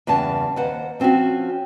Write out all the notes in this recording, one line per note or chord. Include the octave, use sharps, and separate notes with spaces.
E2 G2 C#3 A5
D#2 B4 C5 F#5
F3 C4 C#4 F4 F#4